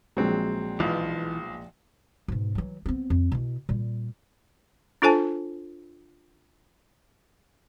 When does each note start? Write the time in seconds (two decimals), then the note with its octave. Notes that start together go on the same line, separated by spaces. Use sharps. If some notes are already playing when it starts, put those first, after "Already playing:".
0.17 A#1 F#3 G#3 C4
0.80 B1 E3 F3
2.28 G#2 B2
2.55 E3 F#3
2.86 B3 C4
3.10 F2
3.32 B2 E4
3.69 A#2 G3
5.02 D4 F4 A4 C5 G#5 A5